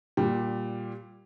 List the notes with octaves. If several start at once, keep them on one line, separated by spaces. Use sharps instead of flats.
A#2 G3